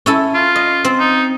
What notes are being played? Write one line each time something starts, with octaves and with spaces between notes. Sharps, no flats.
C#4 E4 A4
F4
D#5
C4
D#4